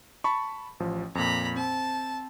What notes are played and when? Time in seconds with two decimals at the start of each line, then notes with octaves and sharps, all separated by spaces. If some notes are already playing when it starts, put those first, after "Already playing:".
0.24 A5 B5 C#6
0.80 A1 F3
1.15 F2 A#2 A#5 B5
1.56 C4 A5